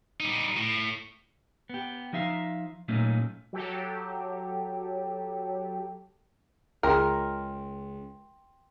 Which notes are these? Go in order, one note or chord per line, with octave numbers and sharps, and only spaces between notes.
G3 D#4
A2
B3 G4
F3 D#4 E5 F5
A#2 F#3 A3 A#3 C#4 D#4
F#3 G4 A4
C#2 A#4 G5 C6